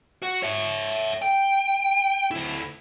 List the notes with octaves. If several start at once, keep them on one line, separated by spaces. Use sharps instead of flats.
F#4
C#5 E5
G5
D2 E4